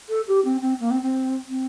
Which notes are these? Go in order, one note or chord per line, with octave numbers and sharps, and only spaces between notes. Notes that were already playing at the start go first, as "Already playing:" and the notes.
A4
G4
C4
C4
A#3
C4
C4
C4